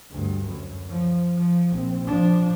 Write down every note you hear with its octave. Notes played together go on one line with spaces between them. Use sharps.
D2 G2
F#2
F3
F3
A#1 C4
F3 D4